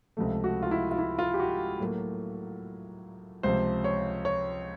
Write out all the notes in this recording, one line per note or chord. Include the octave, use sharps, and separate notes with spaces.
C#2 C3 F3 A3
F#4
F4
E4
F4
E4
F4
G4
F#4
A2 F#3 A#3
C#2 C3 F3 C5
C#5
C#5